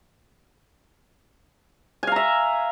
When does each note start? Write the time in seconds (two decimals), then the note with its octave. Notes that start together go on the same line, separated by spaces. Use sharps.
2.03 G#5
2.07 F5
2.12 A#5
2.16 E5